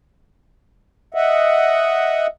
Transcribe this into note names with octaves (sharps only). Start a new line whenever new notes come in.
D#5 E5 F#5